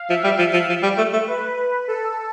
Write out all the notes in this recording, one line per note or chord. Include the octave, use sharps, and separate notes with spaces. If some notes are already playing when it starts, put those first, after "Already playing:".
Already playing: F5
F3 E5
G3
F3
F3
F3
G3
A3
A3
B4
A4